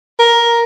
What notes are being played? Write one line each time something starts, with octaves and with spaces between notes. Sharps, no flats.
A#4